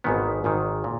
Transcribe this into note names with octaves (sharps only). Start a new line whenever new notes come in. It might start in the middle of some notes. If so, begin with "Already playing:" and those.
G#1 G#2 D#3 B3
G#1 G#2 D#3
A#2